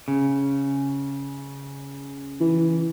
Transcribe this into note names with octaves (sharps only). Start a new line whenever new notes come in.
C#3
E3